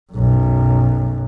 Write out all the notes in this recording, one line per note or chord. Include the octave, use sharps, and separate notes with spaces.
B1 F#2